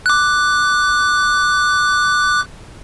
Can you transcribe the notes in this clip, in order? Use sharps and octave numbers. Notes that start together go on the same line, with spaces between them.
D6 F#6